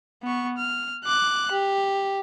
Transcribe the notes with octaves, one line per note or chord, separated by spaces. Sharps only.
B3 C#6
F6
D6 F#6
G4